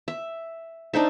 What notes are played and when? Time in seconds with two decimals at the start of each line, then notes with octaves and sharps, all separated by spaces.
0.08 E5
0.94 D4 D#4 C5 E5